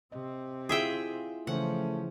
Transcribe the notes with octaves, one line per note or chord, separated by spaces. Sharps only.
C3 C4 D#5
E4 F4 G#4 E5 G5
C#3 E3 F3 A3 C#4 C5 F#5